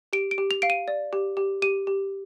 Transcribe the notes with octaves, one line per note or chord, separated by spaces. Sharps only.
G4 D7
D7
G4
F7
F5 D7
D#7
D5
G4
G4
G4 D#7
G4